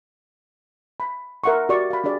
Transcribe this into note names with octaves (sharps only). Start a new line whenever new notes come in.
B5
A#4 E5 F#5 C6 C#6
F#4 G4 A#4 D5 C#6
F5 B5
D4 G4 G#4 D5